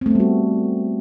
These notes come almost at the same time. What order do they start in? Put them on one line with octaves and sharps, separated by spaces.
C4 A3 B3 G3 F#4